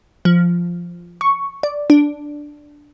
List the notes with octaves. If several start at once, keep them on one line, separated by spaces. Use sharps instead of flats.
F3
C#6
D5
D4